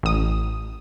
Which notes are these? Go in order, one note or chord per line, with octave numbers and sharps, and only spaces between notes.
A1 D#6